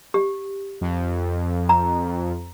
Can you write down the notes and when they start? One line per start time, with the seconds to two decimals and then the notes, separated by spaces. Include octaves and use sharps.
0.14 G4
0.81 F2
1.69 A#5